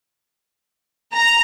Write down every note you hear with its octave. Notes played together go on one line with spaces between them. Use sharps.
A#5